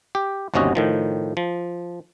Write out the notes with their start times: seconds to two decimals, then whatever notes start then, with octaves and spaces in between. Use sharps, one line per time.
0.15 G4
0.54 G1 D#2 C3 C#4 F#4 D#5
0.75 A2 D#3 F3
1.37 F3